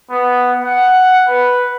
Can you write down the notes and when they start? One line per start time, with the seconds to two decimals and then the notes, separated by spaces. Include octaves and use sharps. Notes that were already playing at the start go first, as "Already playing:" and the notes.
0.10 B3
0.64 F#5
1.28 B4